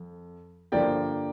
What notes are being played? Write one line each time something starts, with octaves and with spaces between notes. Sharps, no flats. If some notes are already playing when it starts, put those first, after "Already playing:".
Already playing: F2
G2 D3 F3 A#3 D5 G5